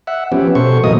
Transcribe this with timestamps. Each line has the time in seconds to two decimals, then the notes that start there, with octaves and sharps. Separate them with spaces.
0.07 E5 F#5
0.32 F3 B3 C#4 G4
0.55 B2 A4 C5 C#6
0.84 A2 E3 F#3 A#3 D#5 D#6